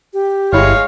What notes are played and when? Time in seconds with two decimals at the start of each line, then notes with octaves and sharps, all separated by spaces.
0.14 G4
0.53 G1 G#3 E4 C#5 F5